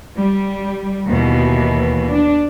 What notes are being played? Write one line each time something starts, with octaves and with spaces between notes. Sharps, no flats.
G3
D#2 B2 E3
D4